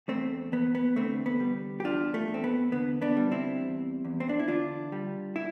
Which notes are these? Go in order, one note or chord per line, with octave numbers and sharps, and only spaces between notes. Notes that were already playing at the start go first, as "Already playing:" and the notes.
E2 A3 C4
E2 B3
B3
D3 A3 C4
B3
G3
G4
E2 D4 F4
A3
E2
C4
B3
D3 B3
B3 D4
G3
C4 E4
E2
E2
C4
D4
E4
D3 D4 F4
G3
E4